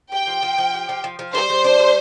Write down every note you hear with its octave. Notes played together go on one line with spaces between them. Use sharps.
G4 G5
F3
F3
F3
G4
F3
F3
F3
G3 C5
G3
D4
G3